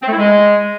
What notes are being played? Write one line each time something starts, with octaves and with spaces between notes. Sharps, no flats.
C4
A3
E4
G#3